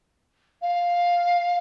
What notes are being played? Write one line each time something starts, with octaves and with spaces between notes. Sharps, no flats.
F5